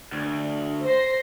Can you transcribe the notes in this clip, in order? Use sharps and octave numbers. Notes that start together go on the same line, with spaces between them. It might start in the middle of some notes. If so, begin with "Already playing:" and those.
D2
C5 A#6 C7